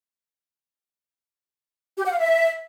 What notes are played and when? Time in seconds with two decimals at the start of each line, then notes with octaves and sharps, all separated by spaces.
1.97 G4
2.04 F#5
2.11 F5
2.19 E5